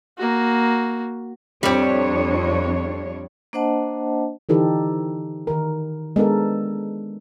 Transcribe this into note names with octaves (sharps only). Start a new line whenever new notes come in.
A#3 F#4
F2 G3 C4 D4 C#5
A#3 D4 C5 D#5 F#5 A5
D3 E3 D#4 G4 A4
D#3 A#4
G#3 B3 D4 A4 A#4